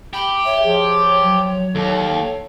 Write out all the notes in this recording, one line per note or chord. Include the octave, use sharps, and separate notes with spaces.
G4 B5
C#5 E5
F3 G#4
F#3
D#2 A4